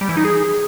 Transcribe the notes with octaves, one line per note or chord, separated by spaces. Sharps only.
G3
E3
D#4
G#4